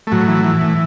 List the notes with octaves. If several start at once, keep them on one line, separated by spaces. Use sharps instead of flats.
A3
A2 F#3
E3
E3
A2